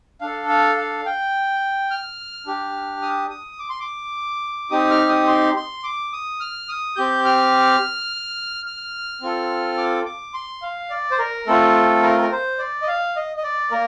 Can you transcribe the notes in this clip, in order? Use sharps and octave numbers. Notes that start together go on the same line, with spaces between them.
D4 A4 F5
F5
F5
G5
F6
D4 G4
D#6
D#6
D6
C6
D6
C4 D#4 G4 D#6
F6
D#6
C6
C6
D6
D#6
F6
D#6
C4 G4 G6
F6
F6
C4 F4 A4
D6
D6
C6
F5
D5
C5
A#4
A3 C4 F4 A4
A#4
A#4
C5
D5
D#5
F5
D#5
D#5
D5
A#3 A#4